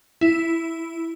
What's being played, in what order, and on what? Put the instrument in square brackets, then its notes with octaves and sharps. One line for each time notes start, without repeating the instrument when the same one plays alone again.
[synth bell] E4